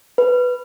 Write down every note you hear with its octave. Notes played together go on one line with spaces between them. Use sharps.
B4